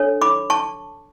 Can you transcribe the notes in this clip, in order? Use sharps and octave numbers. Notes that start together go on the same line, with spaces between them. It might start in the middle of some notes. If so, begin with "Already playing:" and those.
Already playing: D4 A4 C#5
B5 D6
A5 C#6